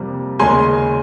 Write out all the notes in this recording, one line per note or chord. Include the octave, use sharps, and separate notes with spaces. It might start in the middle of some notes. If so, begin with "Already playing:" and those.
Already playing: F2 C3 G3 A#3
D#2 C#3 G#3 G#5 C6